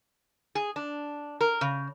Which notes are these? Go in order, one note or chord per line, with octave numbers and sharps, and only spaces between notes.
G#4
D4
A#4
C#3